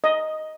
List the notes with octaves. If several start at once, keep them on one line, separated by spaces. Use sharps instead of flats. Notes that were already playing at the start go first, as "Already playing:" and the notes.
D#5